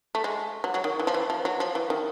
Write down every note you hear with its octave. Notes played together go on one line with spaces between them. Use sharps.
A3
G#3
F#3
F#3
D#3
E3
F3
E3
F3
F#3
F3
E3
D#3